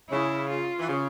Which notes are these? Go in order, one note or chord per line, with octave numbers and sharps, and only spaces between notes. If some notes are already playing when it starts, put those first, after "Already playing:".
C#3 E4
F4
E3
C#3